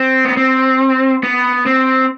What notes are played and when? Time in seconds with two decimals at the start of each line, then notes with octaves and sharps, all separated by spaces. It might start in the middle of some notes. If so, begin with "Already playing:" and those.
Already playing: C4
0.25 B3
0.37 C4
1.24 B3
1.66 C4